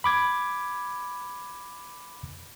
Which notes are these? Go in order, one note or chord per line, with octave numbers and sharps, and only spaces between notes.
B5 D6 G#6